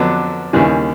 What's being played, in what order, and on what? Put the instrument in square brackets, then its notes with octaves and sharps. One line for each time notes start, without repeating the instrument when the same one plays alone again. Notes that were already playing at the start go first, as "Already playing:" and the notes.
Already playing: [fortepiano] F2 D3 F#3 B3 D4
D#2 C#3 E3 G3